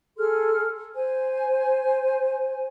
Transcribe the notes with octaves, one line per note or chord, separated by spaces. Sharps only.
G#4 A4 C6 F6
C5 G#5